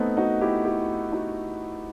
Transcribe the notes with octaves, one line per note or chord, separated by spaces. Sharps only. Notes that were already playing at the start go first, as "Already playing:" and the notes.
Already playing: A3 B3 C4 D#4
D#4 F#4
E4 G4
E4 G4
D#4 F#4